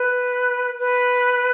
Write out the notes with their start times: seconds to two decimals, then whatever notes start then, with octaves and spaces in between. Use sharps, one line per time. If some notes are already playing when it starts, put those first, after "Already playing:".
Already playing: B4
0.80 B4